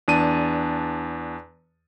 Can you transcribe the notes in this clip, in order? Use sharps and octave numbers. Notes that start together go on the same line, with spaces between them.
E2 D4 A5 D#7